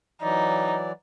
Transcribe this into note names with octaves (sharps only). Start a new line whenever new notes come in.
E3 F#3 D#4 D5